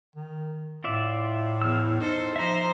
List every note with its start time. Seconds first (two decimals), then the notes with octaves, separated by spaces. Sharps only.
0.16 D#3
0.84 A2 F4 D5 E5
1.62 E2 E6 F6
2.00 D#4 A4 C5
2.36 F3 C5 E5 A#5